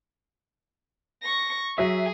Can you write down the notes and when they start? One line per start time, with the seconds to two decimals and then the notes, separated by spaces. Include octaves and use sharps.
1.22 C#6 A#6
1.78 F#3 G#4 E5